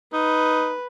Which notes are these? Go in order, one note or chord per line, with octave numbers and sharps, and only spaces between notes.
D#4 B4